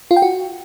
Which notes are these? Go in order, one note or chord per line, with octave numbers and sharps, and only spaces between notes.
F4
G5
F#4